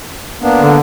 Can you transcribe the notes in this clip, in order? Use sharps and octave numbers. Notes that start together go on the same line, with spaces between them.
A#3 B3 D4
D3